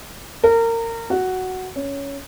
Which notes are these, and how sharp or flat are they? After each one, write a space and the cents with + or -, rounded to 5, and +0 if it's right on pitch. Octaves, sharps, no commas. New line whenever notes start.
A#4 -25
F#4 +5
C#4 +10